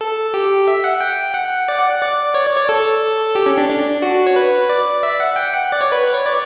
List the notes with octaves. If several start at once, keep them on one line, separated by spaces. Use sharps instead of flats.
A4
G4
E5
F#5
G5
F#5
D5
F#5
D5
C#5
D5
C#5
A4
G4
C#4
D4
D4
F#4
C#5
B4
D5
E5
F#5
G5
F#5
D5
C#5
B4
C#5
D5